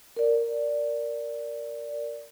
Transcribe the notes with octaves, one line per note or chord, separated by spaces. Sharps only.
A#4 D5